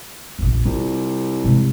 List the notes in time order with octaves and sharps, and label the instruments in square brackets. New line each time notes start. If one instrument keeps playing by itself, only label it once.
[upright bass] F1 A#1
[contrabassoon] C2 [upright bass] F4
[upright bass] C3 G#3